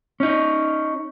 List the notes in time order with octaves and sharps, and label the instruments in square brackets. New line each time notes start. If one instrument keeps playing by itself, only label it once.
[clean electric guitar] C#4 D#4